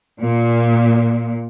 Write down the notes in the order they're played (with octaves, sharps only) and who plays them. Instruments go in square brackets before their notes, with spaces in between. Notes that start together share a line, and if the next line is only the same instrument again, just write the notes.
[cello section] A#2